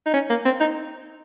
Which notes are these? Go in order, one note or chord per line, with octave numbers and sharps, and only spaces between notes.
D#4
C#4
A#3
C4
D#4